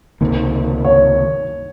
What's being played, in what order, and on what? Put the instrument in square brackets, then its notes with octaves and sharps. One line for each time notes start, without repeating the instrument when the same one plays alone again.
[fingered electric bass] C#2 C3 D#3 A#3
[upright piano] C#5